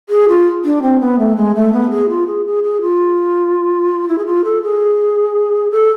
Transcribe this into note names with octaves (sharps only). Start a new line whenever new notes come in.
G#4
F4
D4
C4
B3
A3
G#3
A3
B3
G#4
F4
G#4
G#4
G#4
F4
E4
G#4
F4
A4
G#4
A4